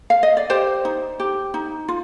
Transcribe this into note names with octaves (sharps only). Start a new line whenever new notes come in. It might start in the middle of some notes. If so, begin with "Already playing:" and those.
F5
D#5
D5
G4 C5
D#4
G4
D#4
F4